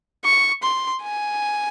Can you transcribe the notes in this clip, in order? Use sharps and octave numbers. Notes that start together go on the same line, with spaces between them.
C#6
C6
G#5